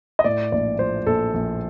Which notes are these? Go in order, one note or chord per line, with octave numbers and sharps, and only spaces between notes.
D#5
A2 D5
A#1 D5
F3 C5
A#1 A4
A#1